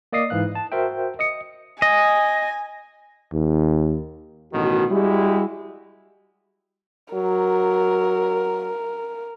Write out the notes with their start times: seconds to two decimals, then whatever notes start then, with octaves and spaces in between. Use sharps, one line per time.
0.13 A#3 D5 D#5 D#6 C7
0.30 G#2 E3 F5 F#6
0.55 A5
0.72 F#4 A#4 C5 E5 G5
1.19 D#5 D#6 C#7
1.82 D#5 G#5
3.33 D#2
4.52 A1 B2 D#3 F#4
4.91 G3 G#3 E4 F#4 G4
7.14 F#3 A#4